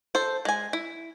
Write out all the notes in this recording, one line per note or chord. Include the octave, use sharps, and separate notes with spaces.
A4 C5
G#3 G#5
E4